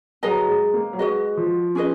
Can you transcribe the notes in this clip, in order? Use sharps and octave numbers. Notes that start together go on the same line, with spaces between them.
F#3 G#4 B4 D#5 A#5
G#3
A#3
F#3
G#3 F#4 B4 D#5
F3
C#4 G#4 B4 D#5